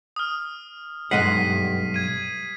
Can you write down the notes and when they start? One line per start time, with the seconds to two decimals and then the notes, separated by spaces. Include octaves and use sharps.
0.16 D#6 F6
1.11 B1 G2 G#3 F#5 B6 C7 D#7
1.94 G#6 D#7